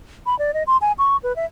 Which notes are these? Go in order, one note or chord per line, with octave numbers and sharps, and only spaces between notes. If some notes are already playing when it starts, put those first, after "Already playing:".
B5
D5
D#5
C6
G#5
C#6
B4
E5